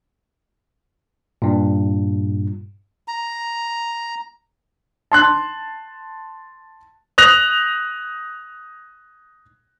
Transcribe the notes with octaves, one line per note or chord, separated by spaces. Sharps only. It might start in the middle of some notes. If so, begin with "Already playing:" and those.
G2 A#2
A#5
A5 C6 F#6
D#6 F#6 A#6 F7